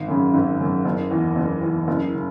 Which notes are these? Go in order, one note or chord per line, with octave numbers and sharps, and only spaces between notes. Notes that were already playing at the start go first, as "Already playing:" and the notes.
Already playing: G#1
F#2 C#3
G#1
F#2 C#3
F#1
E2 E3
F#1
E2 E3
F#1
C#3